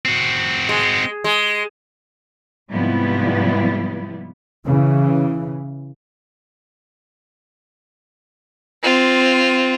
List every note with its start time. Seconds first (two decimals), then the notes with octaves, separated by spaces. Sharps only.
0.05 C4 F#4
0.69 G#3
1.24 G#3
2.71 G#2 C3 F3 G3 B3 E4
4.66 C#3 E3
8.83 C4 F4